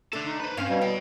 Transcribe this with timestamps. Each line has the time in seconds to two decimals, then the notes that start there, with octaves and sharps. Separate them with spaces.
0.13 A3 D4 A4
0.26 D#4
0.40 B4 C5
0.57 G2 C4 C#4 F5
0.69 B2 G3
0.81 D3 C#5 G5